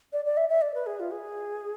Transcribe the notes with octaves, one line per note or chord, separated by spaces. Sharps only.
D5
D5
E5
E5
D5
B4
G#4
F4
G#4